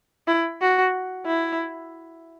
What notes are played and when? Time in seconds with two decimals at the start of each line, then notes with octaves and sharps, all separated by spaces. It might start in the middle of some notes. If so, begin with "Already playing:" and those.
0.28 E4
0.61 F#4
1.26 E4